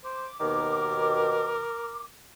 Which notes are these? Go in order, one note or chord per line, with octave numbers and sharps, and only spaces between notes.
C5 D6
D#2 B2 D#3 A#4